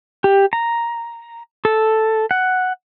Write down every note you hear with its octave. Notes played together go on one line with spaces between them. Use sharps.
G4
A#5
A4
F#5